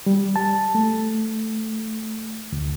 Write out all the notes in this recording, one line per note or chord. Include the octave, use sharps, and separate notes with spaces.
G3
A5
A3
D2